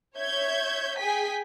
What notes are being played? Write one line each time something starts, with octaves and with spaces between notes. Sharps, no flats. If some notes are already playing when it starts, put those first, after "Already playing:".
C#5 E5 G6 G#6
G#4 G5 G#5 B6